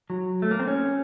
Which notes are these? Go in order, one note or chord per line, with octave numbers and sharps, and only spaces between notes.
F#3
A3
A#3
C4
C#4